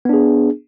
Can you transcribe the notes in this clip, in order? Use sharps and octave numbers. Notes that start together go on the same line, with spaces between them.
B3 D4 G#4